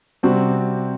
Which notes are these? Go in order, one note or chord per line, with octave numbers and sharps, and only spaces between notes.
C3 G3 C4 F#4